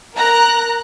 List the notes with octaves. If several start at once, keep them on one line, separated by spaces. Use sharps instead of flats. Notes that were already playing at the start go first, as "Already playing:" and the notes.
A#4 A#5 F#6